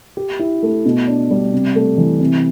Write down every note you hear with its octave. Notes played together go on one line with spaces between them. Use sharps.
G4
E4
A3
B2
D4
G3
C3
A3
E3
C3